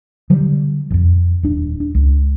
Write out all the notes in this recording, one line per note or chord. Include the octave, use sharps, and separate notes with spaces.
D3 F#3 G3
D#1 F2
D#1 D4
D4
C#2